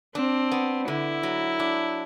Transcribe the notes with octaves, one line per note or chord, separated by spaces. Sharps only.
C4 D4
B3
D3 E4
F#3
D4